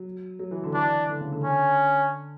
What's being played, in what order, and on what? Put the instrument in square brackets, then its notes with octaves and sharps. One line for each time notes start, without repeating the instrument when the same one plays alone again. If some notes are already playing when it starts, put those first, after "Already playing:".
Already playing: [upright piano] F#3
F#3
E3
D3
[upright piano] E3 [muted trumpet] D4
[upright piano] D3
C#3
D3
[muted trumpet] C#4